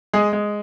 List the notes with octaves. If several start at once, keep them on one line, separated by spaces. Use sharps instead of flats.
G#3 G#4
G#3